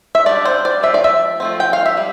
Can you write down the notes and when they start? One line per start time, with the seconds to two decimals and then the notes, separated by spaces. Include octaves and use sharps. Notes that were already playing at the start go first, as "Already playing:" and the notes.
0.15 E5
0.26 G3 D4 D5
0.45 C5
0.65 D5
0.83 F3 C4 E5
0.94 D5
1.04 E5
1.40 F3 A3 C4
1.60 G5
1.73 F5
1.86 E5
1.97 G3